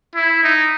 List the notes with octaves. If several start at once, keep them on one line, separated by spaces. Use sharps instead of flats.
E4
D#4